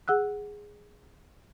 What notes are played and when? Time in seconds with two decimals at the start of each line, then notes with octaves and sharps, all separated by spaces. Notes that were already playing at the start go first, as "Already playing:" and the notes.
0.08 G#4 F#5 E6 F#6